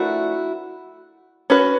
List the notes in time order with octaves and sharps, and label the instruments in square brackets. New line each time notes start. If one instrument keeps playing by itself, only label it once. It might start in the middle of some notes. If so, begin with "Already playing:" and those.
Already playing: [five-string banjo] F3 A3 D4 A#4 [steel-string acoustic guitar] E4 F#4
[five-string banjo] C#4 F#4 B4